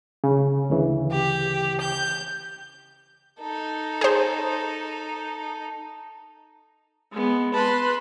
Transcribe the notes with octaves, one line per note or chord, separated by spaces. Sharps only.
C#3
D2 C#3 E3
G4
G6
D#4 A4
G#4 C5
G#3 B3
B4 A5 C6